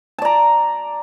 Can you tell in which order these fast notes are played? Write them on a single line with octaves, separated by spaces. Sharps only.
A5 D5 A#5